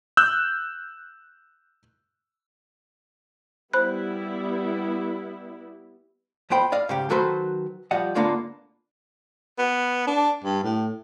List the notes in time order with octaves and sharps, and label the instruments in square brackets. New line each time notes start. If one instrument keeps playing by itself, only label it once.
[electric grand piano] E6 F#6 G6
[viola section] G3 B3 E4 [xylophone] C5 B5 F#6
[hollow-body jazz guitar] F2 B3 C5 G5 B5
D5 D#5 F5
G#2 C#3 G4
D#3 F#3 F#4 A4 B4 C5
F3 G3 D#5 F#5
G#2 D3 A#3 B3 D4 F4
[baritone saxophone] B3
D4
G2
A2